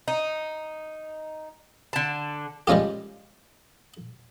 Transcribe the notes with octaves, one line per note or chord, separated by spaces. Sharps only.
D#4
D3 A5
G3 G#3 C#4 F4 G4